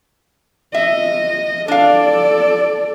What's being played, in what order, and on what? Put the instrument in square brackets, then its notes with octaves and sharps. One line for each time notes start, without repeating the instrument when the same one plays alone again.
[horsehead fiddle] D#5 [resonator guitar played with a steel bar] E5
[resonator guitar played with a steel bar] D4 F5 [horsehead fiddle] A4 D5